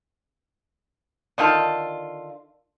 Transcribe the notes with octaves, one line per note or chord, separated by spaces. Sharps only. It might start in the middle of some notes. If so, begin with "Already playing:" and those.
D3 D#3 F4 A4